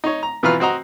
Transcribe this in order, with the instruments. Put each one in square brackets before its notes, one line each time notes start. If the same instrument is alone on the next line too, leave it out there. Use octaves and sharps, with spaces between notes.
[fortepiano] D#4 C#5
A#5
B2 E3 F4 B4 A#5 F6
C4 F#4 D#5 A#5